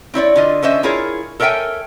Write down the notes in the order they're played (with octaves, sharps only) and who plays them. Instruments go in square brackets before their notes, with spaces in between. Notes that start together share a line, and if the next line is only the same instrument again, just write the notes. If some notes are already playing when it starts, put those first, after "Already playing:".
[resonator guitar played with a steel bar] C4 E4 C#5 D5
D3 F4 D#5
D3 C#4 C5 D#5 E5
E4 F4 G#4 A#4 C#5
A4 A#4 C#5 E5 G5 G#5